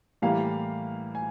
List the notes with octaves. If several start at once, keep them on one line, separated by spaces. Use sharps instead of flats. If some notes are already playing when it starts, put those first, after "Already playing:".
A2 E3 G3 A#3 F5
G#5